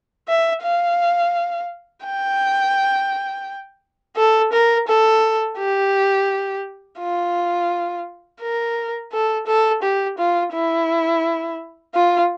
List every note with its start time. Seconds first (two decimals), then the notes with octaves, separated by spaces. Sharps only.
0.28 E5
0.63 F5
2.05 G5
4.16 A4
4.52 A#4
4.88 A4
5.58 G4
6.99 F4
8.41 A#4
9.12 A4
9.47 A4
9.82 G4
10.18 F4
10.53 E4
11.95 F4